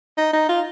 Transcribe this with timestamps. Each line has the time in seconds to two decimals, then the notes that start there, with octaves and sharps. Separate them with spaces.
0.18 D#4
0.34 D#4
0.49 F4